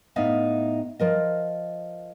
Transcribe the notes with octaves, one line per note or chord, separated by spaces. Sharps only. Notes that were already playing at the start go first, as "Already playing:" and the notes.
A2 B3 D#4 E5 F5
F3 A#4 D#5